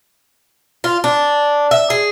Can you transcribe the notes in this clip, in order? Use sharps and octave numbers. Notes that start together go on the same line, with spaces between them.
F4
D4
E5
G#4